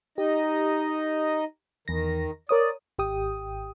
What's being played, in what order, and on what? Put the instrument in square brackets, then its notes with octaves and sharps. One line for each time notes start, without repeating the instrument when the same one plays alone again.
[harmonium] D#4 D#5 [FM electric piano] G4
[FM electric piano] E2 A#6 [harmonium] D#3
[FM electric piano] A#4 C#5 D#6 [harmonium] D5
[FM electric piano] G#1 G4 G5 D#6